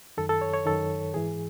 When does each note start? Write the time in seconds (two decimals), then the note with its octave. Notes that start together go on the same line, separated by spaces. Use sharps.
0.18 F#2 D#3 A4
0.29 A4
0.41 C#5
0.54 C#5
0.66 F#2 D#3 A4
1.14 G#2 E3 G#4